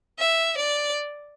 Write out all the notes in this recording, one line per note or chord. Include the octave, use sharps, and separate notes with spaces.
E5
D5